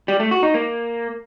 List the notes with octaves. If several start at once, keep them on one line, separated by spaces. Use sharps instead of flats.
G3
A3
F#4
D#4
A#3